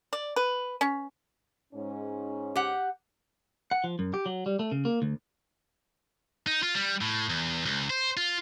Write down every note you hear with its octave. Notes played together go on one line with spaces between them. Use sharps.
D5
B4
C#4
G#2 C#4
G4 F#5
F#5
F3
F#2
G4
F#3
G3
A3
C#3
A#3
D2
D#4
F4
G3
A2
E2
C#2
C5
F4